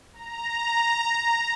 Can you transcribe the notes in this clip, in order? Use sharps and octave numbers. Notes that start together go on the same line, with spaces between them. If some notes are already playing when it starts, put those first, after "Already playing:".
A#5